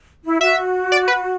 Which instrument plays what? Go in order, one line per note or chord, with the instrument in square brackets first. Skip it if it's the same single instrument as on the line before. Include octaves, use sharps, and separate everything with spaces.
[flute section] E4
[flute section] F#4 [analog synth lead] E5
[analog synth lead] D5
B4